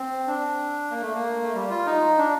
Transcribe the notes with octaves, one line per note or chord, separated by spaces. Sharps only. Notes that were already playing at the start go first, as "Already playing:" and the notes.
Already playing: C4
D4
A#3
A3
A#3
A3
G3
F4
D#4
D4